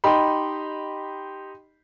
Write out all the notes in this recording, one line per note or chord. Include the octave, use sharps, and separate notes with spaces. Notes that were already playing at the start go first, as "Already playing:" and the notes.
D#4 G4 D#5 B5 C6